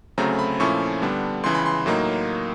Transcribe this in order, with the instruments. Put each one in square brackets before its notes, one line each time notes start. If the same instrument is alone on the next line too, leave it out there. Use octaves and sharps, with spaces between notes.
[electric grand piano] D2 C#3 F#3 A3 C4 A#5
B5
A#2 F3 A3 C#4 E4 C#6
D3 G3 B3 D4
C#2 C#3 E3 C6
B5
C6
A2 F#3 A#3 D#4